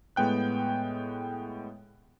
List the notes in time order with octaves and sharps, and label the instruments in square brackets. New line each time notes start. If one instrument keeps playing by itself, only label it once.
[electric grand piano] A2 G#3 B3 G5 F#6